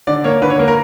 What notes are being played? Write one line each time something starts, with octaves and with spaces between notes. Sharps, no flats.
D3 D5
A#3 C#5
D3 B4
C#5
A#3
A#4